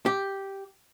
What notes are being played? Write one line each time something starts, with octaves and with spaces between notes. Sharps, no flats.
G4